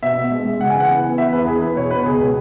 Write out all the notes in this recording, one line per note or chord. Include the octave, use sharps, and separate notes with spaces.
B2 E5
B2
G#3
G#3
C#3 F#5
G#5
E3 F#5
B3
B3
E3 E5
E2 B4
E2 G#4
B3 B4
B2 C#5
B3 B4
C#2 G#4
B2